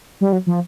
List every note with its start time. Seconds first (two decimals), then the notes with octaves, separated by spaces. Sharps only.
0.21 G3
0.33 F#3
0.47 F3